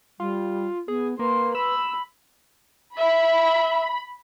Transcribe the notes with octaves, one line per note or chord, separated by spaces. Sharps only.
G3 F4
B3 G#4
A#3 B4 C6
B5 E6
E5 B5